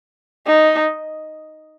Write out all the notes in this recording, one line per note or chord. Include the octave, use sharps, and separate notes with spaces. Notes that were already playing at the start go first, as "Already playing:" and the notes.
D#4